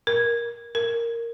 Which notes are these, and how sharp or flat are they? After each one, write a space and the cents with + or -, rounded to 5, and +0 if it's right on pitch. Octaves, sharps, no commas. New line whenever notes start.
A#4 +15
A#4 -5